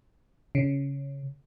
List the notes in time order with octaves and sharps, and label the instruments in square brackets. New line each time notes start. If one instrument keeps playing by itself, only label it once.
[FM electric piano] C#3